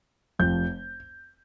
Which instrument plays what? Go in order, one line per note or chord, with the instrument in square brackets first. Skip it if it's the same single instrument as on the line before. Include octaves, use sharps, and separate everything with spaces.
[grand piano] F1 F2 F3 C4 G6